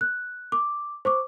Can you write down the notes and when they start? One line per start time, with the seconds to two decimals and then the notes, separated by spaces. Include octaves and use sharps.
0.01 F#6
0.52 D6
1.05 C5 C#6 D6